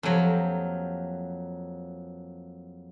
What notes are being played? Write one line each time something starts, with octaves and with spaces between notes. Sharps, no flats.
F2 F3 F#3 A#3 G4